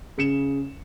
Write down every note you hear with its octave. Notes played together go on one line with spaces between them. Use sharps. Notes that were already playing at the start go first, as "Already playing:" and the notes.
C#3 C#7 E7